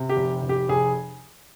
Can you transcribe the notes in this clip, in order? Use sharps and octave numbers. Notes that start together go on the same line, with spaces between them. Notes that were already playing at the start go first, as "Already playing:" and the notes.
Already playing: C3
G4
F1
F1
G4
F1 G#4